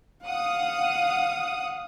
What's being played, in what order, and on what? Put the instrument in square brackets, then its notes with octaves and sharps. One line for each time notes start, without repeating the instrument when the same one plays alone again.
[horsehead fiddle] F5 [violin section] F#5 D#6